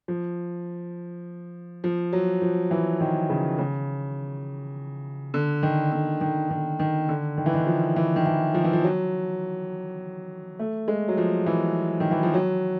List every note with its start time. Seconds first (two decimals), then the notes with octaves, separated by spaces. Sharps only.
0.08 F3
1.84 F3
2.13 F#3
2.42 F3
2.71 E3
3.00 D#3
3.30 C#3
3.59 C#3
5.34 D3
5.63 D#3
5.92 D3
6.21 D#3
6.50 D#3
6.79 D#3
7.09 D3
7.37 D#3
7.46 E3
7.54 D#3
7.67 F3
7.96 E3
8.16 D#3
8.26 E3
8.54 F3
8.64 E3
8.73 F3
8.84 F#3
10.59 A3
10.88 G#3
11.08 F#3
11.18 F3
11.46 E3
12.00 D#3
12.11 E3
12.23 F3
12.34 F#3